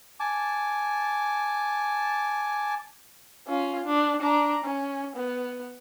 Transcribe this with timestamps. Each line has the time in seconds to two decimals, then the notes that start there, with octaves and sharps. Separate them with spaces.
0.20 G#5 A5 D6
3.48 C#4 F4
3.86 D4
4.22 D4 A#5
4.64 C#4
5.16 B3